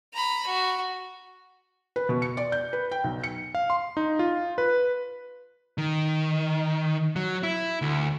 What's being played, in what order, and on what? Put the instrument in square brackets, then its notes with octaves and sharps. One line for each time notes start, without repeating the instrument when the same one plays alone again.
[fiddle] A#5 B5
F#4
[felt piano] B4
B2
C#7
D5
G6
B4
G5
B1
C#7
[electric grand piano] F5
C6
D#4
F4
B4
[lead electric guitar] D#3
F#3
E4
D2